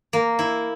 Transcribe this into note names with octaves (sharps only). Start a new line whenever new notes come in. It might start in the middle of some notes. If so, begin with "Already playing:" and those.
A#3
E4